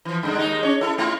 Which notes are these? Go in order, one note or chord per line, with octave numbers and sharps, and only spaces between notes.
E3 F3
G2 D3 G#3
D#2 G#3 D#4
C#4 C#5
E4 A4
A3 E4 F4